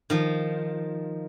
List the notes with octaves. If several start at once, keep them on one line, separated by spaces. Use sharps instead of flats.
D#3 F3